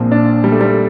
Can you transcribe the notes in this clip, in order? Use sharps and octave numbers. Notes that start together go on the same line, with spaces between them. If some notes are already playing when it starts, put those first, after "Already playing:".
Already playing: A#1 A#2 F3 C4
D4
G3
A3
G3